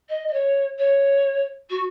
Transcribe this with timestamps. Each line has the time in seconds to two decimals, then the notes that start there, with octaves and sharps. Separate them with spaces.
0.09 D#5
0.27 D#5
0.33 C#5
0.78 C#5
1.69 F#4